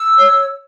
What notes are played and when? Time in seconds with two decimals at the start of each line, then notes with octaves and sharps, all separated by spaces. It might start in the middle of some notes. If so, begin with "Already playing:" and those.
Already playing: E6
0.17 C#5